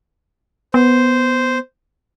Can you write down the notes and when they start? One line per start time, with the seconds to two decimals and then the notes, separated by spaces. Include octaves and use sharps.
0.74 B3 C5